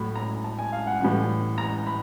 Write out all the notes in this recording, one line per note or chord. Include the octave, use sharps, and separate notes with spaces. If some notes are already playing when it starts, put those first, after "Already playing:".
Already playing: A2 F#3 B5
A#5
A5
G#5
F5
F#5
A2 E3 G3
A#5
B5